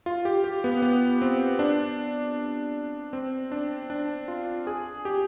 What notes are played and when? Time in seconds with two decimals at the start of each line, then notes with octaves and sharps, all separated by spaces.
0.06 F4
0.25 G4
0.44 G4
0.64 B3
0.82 B3
1.22 C4
1.59 D4
3.13 C4
3.52 D4
3.90 D4
4.28 F4
4.67 G#4
5.05 G4